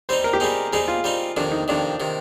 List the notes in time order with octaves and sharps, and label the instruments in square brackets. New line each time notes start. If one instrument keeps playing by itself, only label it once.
[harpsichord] G3 C4 D#4 [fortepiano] C5
[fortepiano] A#4
G4
[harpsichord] G3 C4 D#4 [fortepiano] G#4
[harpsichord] G3 C4 D#4 [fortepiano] G#4
[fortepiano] F4
[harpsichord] G3 C4 D#4
[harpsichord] F2 C3 D#3 [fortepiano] D4
[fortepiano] D#4
[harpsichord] F2 C3 D#3 [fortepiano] D4
[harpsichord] C3 D#3